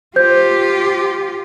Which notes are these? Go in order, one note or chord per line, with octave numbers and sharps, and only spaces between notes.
F4 G4 C5 G6